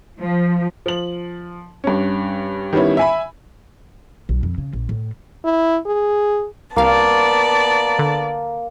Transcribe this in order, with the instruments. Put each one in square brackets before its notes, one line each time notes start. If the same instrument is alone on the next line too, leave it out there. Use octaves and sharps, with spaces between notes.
[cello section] F3
[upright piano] F3 F#7
G2 C#4
D#3 G3 B3 C#4 E4
E5 G#5 B5
[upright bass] B1
F2
C#3
A#1
A2
[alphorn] E4
G#4
[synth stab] C2 F5 [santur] A#3 [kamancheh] B3 D5 [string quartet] A5
[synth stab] D3